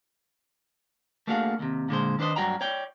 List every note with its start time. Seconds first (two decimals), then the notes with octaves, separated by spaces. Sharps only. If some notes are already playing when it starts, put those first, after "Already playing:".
1.27 A3 A#3 D4 F#4 G#4 F5
1.59 D#2 C3
1.89 A#2 D3 G#3 C5
2.19 D#3 D4 B4 C5 D#5
2.36 G2 F#3 F#4 D5 G5 A#5
2.61 C#5 D5 G5